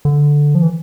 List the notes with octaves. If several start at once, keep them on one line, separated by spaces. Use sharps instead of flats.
D3
F3
E3